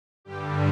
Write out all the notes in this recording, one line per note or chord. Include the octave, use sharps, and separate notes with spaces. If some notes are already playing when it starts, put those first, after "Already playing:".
G2 D3 G3 G4